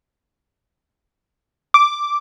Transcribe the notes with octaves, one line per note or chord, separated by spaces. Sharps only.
D6